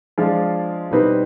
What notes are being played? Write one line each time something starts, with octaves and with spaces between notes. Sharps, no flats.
F3 G#3 D4 F4
B2 G3 C4 D#4 B4